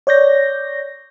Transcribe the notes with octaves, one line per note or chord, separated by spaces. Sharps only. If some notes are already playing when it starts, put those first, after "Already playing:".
C#5 D5 G6 A#6